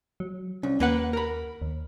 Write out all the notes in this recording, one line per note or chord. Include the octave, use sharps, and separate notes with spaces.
F#3
C2 C#4
D#2 A#3 B4 F#5
A#4 B5
D#2